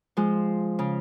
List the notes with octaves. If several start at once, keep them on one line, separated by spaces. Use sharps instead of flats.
F3 G#3
C#3